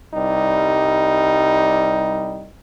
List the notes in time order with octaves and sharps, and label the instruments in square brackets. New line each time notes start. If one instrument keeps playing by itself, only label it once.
[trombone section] C2 G3 D#4